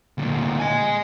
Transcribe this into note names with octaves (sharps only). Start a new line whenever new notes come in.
D2 A#2
D#5 G#5